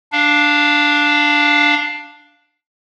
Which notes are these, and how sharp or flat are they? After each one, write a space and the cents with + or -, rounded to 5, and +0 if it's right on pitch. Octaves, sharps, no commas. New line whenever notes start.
D4 +0 F5 +0